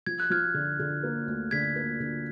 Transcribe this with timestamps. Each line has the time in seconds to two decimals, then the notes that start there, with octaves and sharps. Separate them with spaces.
0.06 F3 G#6
0.20 F#6
0.30 F3 F6 G#6
0.54 D3
0.79 D3
1.03 A#3
1.27 D2
1.51 D3 G#6 B6
1.76 A#3
2.00 D3